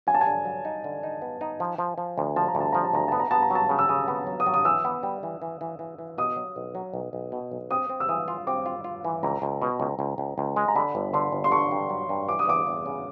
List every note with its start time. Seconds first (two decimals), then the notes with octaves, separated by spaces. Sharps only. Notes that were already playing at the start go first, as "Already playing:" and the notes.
0.07 F#3 G#5
0.14 A5
0.21 G#5
0.27 D3
0.45 F#3
0.65 D#4
0.84 D3
1.03 D#4
1.22 B3
1.41 D#4
1.60 F3
1.78 F3
1.98 F3
2.18 D2
2.36 F3 A5
2.48 A#5
2.55 D2
2.60 A5
2.72 F3 A#5
2.84 A5
2.93 D2 A#5
3.08 B3 A5
3.20 A#5
3.31 B3 A5
3.42 A#5
3.51 F#3 A5
3.69 C#3
3.79 E6
3.89 C#3 D#6
4.08 B3
4.27 F#3
4.40 D#6
4.46 F#3
4.54 D#6
4.65 E3 E6
4.85 B3
5.03 G3
5.23 E3
5.42 E3
5.61 E3
5.79 E3
5.98 E3
6.18 B2 D#6
6.37 F#3
6.56 B1
6.75 F#3
6.94 B1
7.13 B1
7.32 B2
7.52 B1
7.70 C4 D#6
7.89 C4
8.00 E6
8.09 E3 D#6
8.28 F4
8.47 C4 D6
8.66 F4
8.84 F4
9.05 E3
9.23 C#2 A#5
9.42 C#2
9.62 B2
9.80 C#2
9.99 C#2
10.18 C#2
10.38 C#2
10.56 G#3
10.68 A#5
10.76 D3 B5
10.95 G1
11.13 D3 C6
11.32 G1
11.44 C6
11.51 D3 C#6
11.71 G2
11.90 F#3
12.09 G2
12.28 E3 D6
12.39 D#6
12.48 E2 D6
12.67 E2
12.86 C#3